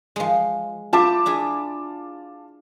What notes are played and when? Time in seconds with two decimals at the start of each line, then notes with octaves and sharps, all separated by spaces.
0.16 F3 G#3
0.93 E4 F4 C5 E5 A5 D6
1.26 D4 E4 G#4